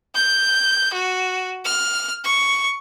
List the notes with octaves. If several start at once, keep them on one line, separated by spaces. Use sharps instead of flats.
G6
F#4
F6
C#6